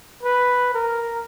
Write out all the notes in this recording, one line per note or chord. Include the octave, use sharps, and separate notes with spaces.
B4
A#4